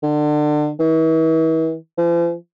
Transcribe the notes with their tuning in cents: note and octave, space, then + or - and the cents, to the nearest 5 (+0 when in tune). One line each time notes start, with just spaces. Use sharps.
D3 +30
E3 -40
F3 -45